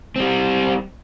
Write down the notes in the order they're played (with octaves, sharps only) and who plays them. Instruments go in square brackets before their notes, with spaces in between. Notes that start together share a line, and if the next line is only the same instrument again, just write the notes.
[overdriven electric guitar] G3 C4